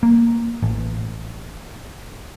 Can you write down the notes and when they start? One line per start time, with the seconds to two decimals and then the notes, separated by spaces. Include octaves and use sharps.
0.03 A#3
0.62 A1